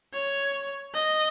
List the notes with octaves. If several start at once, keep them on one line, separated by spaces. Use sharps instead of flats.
C#5
D#5